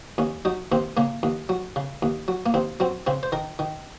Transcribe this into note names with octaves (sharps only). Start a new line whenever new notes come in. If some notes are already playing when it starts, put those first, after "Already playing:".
D#2 C#4
F#3 D#4
D#2 C4
C#3 A#3
D#2
F#3
C#3
D#2
F#3
A#3
D#2 C4
F#3 C4
C#3 C4
C5
D#3 A#4
D#3